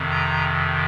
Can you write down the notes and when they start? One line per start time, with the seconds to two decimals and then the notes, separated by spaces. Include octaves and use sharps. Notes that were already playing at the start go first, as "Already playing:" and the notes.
Already playing: F2 C3 D#3
0.11 A#5